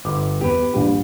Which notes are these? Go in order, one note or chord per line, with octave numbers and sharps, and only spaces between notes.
G1 D6
E2 G4 B4
A#1 G3